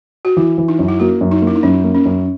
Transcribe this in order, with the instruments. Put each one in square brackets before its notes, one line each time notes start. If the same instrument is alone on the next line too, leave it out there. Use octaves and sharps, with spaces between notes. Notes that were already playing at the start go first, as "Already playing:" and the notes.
[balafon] F#4
[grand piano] E3 [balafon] E4
[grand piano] E3
[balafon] D#4
[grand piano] F#2
[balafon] E4
[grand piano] A#3 [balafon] F#4
[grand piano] F#2
[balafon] D#4
[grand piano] A#3
[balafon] E4
D#4
[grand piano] F#2 [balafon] C#4
[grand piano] A#3
[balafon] C#4
[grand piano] F#2